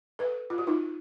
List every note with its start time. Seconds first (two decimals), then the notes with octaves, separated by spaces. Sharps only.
0.19 A4 B4
0.50 F4
0.58 F#4
0.67 D#4 F4